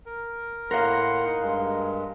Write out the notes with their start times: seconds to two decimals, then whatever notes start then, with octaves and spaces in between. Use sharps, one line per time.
0.06 A#4
0.71 A2 A#4 F5 F#5 C6
1.25 D#4
1.41 G2 G#3